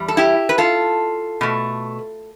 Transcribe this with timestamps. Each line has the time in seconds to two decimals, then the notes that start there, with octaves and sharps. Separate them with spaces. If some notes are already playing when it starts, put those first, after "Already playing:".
Already playing: E2 G3
0.08 A4
0.17 E4 G4
0.49 B4
0.58 F4 A4
1.41 B2 A3